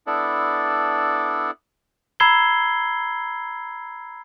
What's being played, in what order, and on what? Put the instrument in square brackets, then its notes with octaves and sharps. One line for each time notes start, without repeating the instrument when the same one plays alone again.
[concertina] B3 D4 E4 A4 D5
[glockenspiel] A#5 B5 E6 G#6 C7 G7